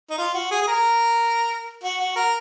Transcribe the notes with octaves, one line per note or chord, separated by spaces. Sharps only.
D#4
F4
F#4
G#4
G#4
A#4
F#4
F#4
A#4